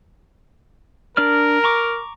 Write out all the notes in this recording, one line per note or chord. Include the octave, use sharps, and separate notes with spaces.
D4 A#4 D5 F6
A#5 C#6 D6